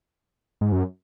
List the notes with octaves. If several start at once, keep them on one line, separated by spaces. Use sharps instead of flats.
G#2
F#2